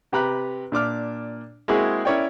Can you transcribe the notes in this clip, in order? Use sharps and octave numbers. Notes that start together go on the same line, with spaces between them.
C3 G4 B4 A#5 B5 F#6
A#2 D4 D6 F6
G#3 A#3 C4 E4 F#4 G#4
C#4 E4 A#4 C#5 D5 G5